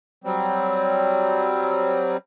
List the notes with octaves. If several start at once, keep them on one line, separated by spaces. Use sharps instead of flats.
F#3 G3 C4